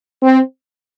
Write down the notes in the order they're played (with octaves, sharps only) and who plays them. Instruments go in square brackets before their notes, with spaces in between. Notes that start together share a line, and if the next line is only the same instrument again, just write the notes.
[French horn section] C4